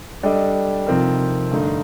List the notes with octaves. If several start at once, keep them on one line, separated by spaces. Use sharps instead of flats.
G3 D4 A4 D#5
C3 F3 C4 D#4 A#4
G2 D3 A3 D#4